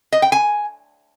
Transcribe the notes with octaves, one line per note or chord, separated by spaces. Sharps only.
D#5
G5
G#5